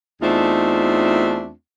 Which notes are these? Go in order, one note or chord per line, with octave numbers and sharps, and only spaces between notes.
E2 A3 C4 D4 D#4 F4